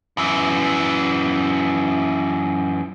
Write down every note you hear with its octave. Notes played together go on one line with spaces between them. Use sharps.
F#2 E3